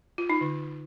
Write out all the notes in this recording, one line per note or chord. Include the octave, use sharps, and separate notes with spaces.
F4
D#4
D3